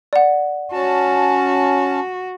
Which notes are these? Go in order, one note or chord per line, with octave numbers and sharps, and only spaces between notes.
D5 F#5
C#4 F#4 A5